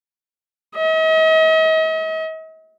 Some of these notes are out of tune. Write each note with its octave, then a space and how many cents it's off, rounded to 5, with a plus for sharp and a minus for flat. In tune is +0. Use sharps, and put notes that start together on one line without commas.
D#5 +45